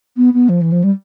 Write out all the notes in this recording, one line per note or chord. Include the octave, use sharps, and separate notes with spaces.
B3
B3
F3
E3
F3
G3